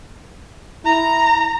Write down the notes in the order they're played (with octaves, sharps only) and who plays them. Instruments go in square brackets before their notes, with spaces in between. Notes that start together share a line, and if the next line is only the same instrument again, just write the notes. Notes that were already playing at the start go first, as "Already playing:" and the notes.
[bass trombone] E4 [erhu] A#5